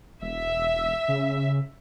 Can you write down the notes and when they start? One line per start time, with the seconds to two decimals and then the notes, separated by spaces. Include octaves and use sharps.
0.22 E1 E5
1.08 C#3